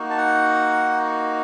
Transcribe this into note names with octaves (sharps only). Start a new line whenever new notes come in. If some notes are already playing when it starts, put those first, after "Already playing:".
Already playing: A#3 D#4 F#4
A5
F#5